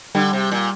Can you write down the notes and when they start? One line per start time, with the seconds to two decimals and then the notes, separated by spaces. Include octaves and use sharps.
0.15 D3 G3
0.33 C3
0.52 A#2